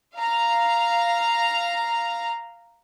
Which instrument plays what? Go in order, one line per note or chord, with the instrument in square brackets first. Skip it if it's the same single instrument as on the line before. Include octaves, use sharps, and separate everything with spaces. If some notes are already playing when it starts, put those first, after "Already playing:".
[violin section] F5 A#5